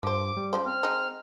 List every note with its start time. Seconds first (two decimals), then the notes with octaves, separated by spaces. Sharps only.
0.03 G2 F3 C5 D6
0.37 G3
0.53 C#3 F3 C5
0.66 C4 F6
0.83 G#3 D#4